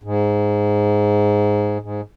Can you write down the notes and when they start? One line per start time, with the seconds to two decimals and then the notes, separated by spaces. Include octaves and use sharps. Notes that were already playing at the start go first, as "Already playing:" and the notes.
0.03 G#2
1.82 G#2